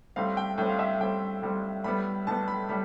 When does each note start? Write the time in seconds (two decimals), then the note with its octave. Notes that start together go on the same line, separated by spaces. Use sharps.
0.16 A2 G3 C4 F5
0.37 G5
0.58 A2 G5
0.61 G3 C4
0.70 F5
0.79 E5
1.00 A2 G3 C4 G5
1.42 A2 G3 C4
1.84 A2 G3 B3 B5
2.27 A2 G3 B3 A5
2.48 B5
2.69 A2 G3 B5